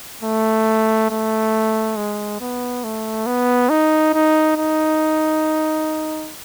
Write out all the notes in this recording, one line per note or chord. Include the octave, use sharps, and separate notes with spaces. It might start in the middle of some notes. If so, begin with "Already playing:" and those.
A3
A3
G#3
B3
A3
B3
D#4
D#4
D#4